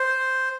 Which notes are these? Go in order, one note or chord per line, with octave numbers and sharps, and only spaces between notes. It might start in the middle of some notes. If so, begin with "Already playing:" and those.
Already playing: C5